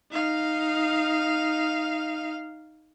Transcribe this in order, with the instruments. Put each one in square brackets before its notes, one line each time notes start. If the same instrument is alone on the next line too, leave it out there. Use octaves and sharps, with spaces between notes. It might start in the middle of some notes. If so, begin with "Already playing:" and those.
[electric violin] D#4 F5